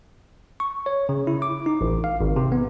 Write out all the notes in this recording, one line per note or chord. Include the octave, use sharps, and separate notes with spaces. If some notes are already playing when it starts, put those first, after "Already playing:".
C#6
C#5
C#3
E4
D6
D#4
A1
F5
G#1
C3
B3